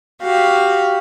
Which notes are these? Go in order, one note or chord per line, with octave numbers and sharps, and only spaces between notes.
F#4 G4 F5